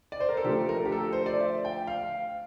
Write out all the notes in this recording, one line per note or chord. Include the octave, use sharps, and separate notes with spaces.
D5
C5
A#4
A4
D3 F3 A3 G4
A#4
G4
A4
C5
D5
E5
G5
F5